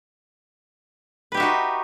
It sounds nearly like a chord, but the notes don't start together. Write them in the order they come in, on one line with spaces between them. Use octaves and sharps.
B4 G4 E5 F#4 D#4